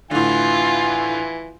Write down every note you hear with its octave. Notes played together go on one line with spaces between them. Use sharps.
A2 D3 E3 F4 G#5